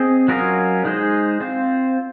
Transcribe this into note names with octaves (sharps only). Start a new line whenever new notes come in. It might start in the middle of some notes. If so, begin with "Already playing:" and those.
Already playing: C4 G#4 D#5
F#3 C#4 F4 A#4 D#5
G#3 D#4 G#4 C5 D#5
C4 F4 C5